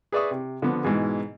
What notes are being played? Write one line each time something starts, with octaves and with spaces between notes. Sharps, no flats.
G#4 B4 D5 E5 C#6 D#6
C3
D3 F3 B3
G#2 B2 E3 G#3